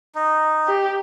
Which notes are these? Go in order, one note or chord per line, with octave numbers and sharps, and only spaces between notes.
D#4
G4